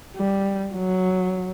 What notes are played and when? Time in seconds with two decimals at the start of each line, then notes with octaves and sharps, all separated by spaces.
0.16 G3
0.74 F#3